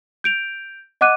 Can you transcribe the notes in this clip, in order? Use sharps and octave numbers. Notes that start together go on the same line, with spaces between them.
G6 D7 F7
D#5 F#5 D6 F#6 D#7